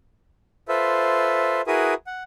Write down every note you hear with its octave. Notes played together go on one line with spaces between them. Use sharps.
F4 A4 B4 C5 E5
E4 F#4 G#4 A#4 B4 D#6
F#5